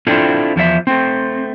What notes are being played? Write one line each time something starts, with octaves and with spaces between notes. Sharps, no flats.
C4 D4 E4 F4 A4
E2 F3 D#4 E5
A3 C4